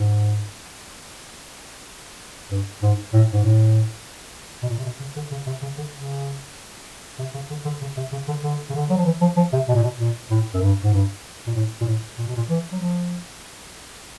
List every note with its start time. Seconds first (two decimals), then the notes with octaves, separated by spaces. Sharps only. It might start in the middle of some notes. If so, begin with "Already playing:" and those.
Already playing: G#2
2.51 G2
2.82 G#2
3.13 A2
3.32 G#2
3.44 A2
4.63 B2
4.69 A#2
4.77 C3
4.85 B2
5.00 C#3
5.16 D3
5.31 C#3
5.46 C3
5.62 C#3
5.78 D3
5.93 C#3
7.19 C3
7.34 C#3
7.50 D3
7.65 D3
7.81 C#3
7.97 C3
8.12 C#3
8.28 D3
8.43 D3
8.69 C#3
8.75 D3
8.90 F#3
8.98 F3
9.05 E3
9.21 F3
9.37 F3
9.53 C3
9.68 B2
9.75 A#2
9.83 B2
10.00 A#2
10.30 A2
10.54 F#2
10.62 G2
10.83 G#2
10.93 G2
11.47 A#2
11.55 A2
11.81 A#2
11.86 A2
12.18 A#2
12.27 B2
12.36 A#2
12.49 E3
12.72 F#3
12.80 F3